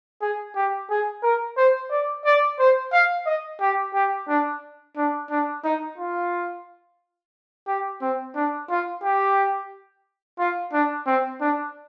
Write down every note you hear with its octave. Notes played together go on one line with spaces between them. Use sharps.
G#4
G4
G#4
A#4
C5
D5
D5
C5
F5
D#5
G4
G4
D4
D4
D4
D#4
F4
G4
C4
D4
F4
G4
F4
D4
C4
D4